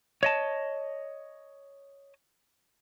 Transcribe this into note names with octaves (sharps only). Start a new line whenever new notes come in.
C#5 D#5 A5